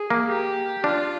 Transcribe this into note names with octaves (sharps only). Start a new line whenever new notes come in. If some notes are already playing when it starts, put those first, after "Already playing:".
Already playing: G#4
A#3
G4
D4 F4